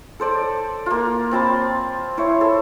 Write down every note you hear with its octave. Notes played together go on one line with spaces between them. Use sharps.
A4 C5 D5
A#3 F4
C4 F4 A5 B5
E4 C5 C#5
A4